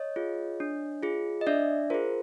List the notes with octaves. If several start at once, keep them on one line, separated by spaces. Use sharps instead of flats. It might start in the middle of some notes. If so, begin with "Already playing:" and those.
Already playing: C#5 D#5
F4 G#4
D4
F4 G#4
D#5
D4 D5 E5
F4 G#4 A#4 C5